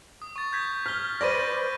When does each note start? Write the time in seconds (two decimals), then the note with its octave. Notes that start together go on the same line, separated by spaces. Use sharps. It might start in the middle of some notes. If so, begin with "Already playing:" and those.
0.22 D#6
0.36 C#6 A6
0.53 G6 G#6 B6
0.86 F6 B6 G7
1.21 B4 C5 D5 A#6 D#7
1.39 G6